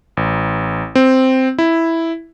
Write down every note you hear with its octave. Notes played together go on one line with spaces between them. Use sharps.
A1
C4
E4